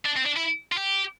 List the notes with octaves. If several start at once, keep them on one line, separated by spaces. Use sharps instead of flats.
D4
C4
D4
E4
F4
G4